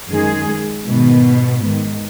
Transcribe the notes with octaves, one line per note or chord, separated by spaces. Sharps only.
F#2 D#3 G#3 G#4
G#2 B2 D#3 B3
G#2 D#3